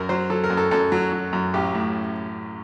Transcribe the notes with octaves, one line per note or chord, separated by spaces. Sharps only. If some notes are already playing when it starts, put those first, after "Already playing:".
Already playing: F#2 A#4
F#3 C5
F#3 A4
A#4
F#2
A4
F#2 A4
F#3
F#3
F#2
A1 G4
A2